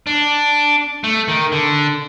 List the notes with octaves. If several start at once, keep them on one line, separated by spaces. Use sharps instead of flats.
D4
A3
D#3
D3